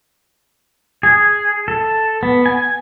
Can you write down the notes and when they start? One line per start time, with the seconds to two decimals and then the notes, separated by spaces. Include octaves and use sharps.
1.03 G#4
1.68 A4
2.23 B3
2.46 G#5